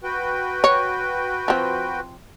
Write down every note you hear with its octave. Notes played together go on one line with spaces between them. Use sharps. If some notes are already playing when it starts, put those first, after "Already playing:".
F#4 B4 G5
C#5
F3 C4